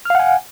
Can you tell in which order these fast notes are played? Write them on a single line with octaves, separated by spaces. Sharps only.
F6 F5 F#5 G#5